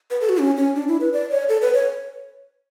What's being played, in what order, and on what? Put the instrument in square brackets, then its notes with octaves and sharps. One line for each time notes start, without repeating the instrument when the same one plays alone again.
[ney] B4
A4
F#4
C#4
C#4
D4
E4
B4
D5
C#5
A4
B4
C#5